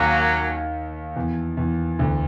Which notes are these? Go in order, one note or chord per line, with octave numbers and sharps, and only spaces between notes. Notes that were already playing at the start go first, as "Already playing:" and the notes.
Already playing: D#2 D#3 F#3 A#3 C#4
E2 E3
E2 E3
D2 D3